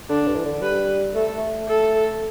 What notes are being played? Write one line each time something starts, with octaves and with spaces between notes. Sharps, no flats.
D3 D4
G2
E3
D3
G3 B4
A3 A4
A3
A4